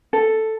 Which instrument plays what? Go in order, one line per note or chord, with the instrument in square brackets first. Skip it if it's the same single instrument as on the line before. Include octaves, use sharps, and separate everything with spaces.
[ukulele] A4